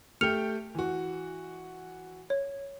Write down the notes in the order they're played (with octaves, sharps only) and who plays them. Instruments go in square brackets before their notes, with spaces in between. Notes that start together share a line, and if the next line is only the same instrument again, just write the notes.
[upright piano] A3 G4 G5 [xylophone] F6 C#7 F7
[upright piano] E3 F#4
[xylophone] C#5